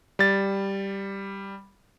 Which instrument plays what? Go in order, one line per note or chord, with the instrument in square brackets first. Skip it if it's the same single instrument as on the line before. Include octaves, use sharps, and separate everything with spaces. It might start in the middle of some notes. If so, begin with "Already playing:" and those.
[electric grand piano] G3 A6